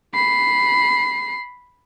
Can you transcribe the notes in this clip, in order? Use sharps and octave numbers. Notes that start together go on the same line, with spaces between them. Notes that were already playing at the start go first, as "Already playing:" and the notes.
B5 C7